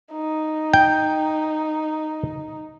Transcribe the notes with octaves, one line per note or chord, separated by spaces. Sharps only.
D#4
G5